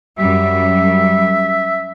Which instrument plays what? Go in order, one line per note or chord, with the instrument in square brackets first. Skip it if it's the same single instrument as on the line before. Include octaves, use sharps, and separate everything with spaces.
[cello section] F#2 G3 [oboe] E5